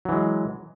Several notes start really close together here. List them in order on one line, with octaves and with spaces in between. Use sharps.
F#3 E3 G#3